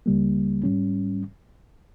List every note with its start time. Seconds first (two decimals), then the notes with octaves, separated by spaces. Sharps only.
0.06 C#2 C#3 G3 A#3
0.64 G#2 G3 C#4